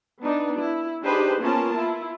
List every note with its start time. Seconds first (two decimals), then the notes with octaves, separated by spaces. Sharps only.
0.21 B3 D4 D#4
0.60 E4
1.02 D4 D#4 G4 G#4 B4 C5
1.40 A#3 B3 C#4 F4 A#4 A5
1.75 E4 F4